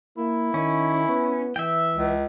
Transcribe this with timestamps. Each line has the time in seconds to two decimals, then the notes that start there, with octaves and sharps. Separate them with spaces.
0.17 A#3 E4
0.54 D#3 C#4
1.08 B3
1.56 E3 E5 G5
1.95 C#2